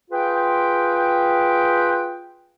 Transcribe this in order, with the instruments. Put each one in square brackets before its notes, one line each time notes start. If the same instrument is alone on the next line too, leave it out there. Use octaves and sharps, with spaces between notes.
[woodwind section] F4 G#4 B4 G5